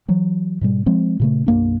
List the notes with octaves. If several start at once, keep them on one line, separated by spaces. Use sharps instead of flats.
E3 F#3
G#2 B2 G3
F3 G#3 C4
A#2 C#3 A3
B1 F#2 A#3 D4